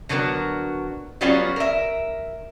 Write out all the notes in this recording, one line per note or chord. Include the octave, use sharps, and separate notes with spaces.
D3 F#3 B3 F#4 A#4
F#3 G3 B3 C#4 F4 F#4
A#4 E5